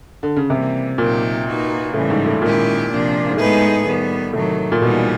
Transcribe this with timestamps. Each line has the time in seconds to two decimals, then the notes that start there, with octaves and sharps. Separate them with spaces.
0.23 D3
0.36 C#3
0.50 C3 E3 G3 A#3
0.98 A#2 F#3 A#3 D#4 G4
1.46 A#3 D#4 F#4 B4
1.94 A2 C#3 E3 G3
2.10 G#2
2.26 A2
2.42 A#2 D#3 G#3 C#4 E4 G4
2.90 C3 F3 A#3 D4
3.30 G#2
3.37 A2 G#3 B3 D#4 G#4 B4
3.85 D#3 G3 B3
4.33 A2 C3 D#3 F#3
4.72 A#2
4.81 B2 E3 G3 B3 D#4 G#4